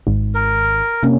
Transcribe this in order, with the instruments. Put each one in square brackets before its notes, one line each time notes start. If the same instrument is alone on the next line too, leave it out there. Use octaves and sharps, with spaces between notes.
[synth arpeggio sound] G#1
[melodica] A#4
[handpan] C3 A#3 C#4